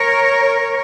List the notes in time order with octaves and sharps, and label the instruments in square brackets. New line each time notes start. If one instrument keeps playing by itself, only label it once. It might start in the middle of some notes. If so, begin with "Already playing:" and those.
Already playing: [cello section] A#4 C#5